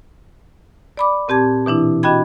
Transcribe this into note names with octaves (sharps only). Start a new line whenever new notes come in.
D5 B5 D6
A#2 C4 G4 A5 G#6
B2 E3 D4 E4
D4 F#4 D#5 G5 B5 G#6